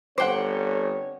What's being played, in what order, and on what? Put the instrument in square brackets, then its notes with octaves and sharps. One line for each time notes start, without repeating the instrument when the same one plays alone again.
[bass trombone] G1 [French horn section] C4 A4 C#5 [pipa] C5 G5 [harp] F#5 D6